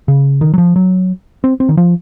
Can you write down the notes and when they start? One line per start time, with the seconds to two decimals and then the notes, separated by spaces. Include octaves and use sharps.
0.08 C#3
0.41 D#3
0.54 F#3
0.58 F3
0.76 F#3
1.44 C4
1.60 C4
1.69 D#3
1.77 F3